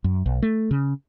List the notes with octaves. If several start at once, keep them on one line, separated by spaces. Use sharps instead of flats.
F#2
B1
A3
C#3